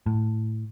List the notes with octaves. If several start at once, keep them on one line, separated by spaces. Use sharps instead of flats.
A2